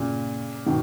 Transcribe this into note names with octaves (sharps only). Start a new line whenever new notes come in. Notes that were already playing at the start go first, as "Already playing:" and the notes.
Already playing: A#2 C#3
B2 D#3